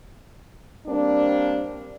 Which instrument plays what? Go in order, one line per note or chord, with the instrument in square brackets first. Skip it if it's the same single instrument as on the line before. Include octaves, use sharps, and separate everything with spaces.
[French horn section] G3 A#3 C4 D4